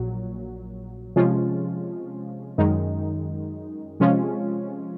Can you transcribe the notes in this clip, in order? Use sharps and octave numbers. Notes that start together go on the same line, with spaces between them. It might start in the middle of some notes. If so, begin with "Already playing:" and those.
Already playing: A#1 A#2 F#3
C3 F3 G#3 C#4 F4
F#2 D#3 G#3 D#4
C3 F3 G#3 C#4 F4